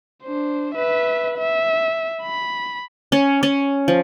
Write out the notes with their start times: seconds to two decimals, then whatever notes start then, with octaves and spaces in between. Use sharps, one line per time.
0.23 D4 C5
0.75 B4 E5
1.38 E5
2.23 B5
3.12 C#4
3.43 C#4
3.88 F3